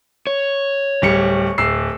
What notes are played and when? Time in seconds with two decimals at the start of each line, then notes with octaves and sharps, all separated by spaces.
0.27 C#5
1.02 D1 G3 C#7
1.58 D1 E6 C7